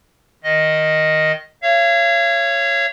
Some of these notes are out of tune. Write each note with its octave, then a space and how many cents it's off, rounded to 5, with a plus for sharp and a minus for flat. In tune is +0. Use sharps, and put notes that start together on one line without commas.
D#3 +0 D#5 +0
C#5 -5 F5 -40